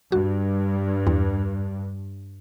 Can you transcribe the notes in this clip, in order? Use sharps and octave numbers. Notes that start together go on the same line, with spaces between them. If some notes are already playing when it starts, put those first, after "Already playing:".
G2 F#4
E2